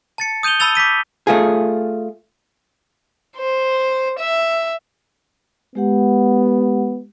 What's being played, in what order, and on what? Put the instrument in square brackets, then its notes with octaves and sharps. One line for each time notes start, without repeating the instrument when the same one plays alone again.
[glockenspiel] A5 A6 C#7
D#6 G6 D#7 F7 G7
A5 B5 E6 A6 F7 G7
D6 G6 B6 D#7
[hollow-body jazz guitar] A3 F4 G#4
[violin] C5
E5
[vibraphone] G#3 G4 F#5 [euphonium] B3